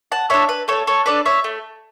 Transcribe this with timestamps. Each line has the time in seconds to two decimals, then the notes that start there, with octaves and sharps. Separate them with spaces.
0.12 F#5 A5
0.30 D4 A4 C#5 E5
0.49 B4
0.68 A3 A4 C#5
0.87 A4 C#5
1.06 D4 A4 B4 D5
1.26 C#5 E5
1.44 A3